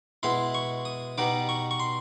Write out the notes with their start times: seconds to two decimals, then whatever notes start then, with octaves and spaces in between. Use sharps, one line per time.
0.23 B2 G#3 B3 E4 C6
0.55 C#6
0.85 D#6
1.18 B2 G3 B3 D#4 D6
1.49 C#6
1.71 C#6
1.80 C6